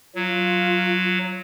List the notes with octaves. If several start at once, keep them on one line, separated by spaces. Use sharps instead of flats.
F#3 F4